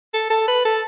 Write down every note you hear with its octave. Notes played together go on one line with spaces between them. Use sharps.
A4
A4
B4
A4